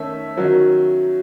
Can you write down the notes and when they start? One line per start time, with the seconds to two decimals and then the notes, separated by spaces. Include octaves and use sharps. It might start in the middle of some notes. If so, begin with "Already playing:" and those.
Already playing: D#3 A3 C#4 E5
0.37 D#3 F#3 C#4